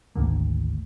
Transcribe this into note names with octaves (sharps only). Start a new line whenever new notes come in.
G#1 D2 A#3